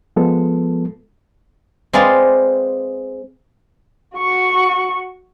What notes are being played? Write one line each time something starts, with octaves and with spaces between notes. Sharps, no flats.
F3 G#3 B3 A4
G#3 C4 G#4 B4 D5 F5
F#4 C#6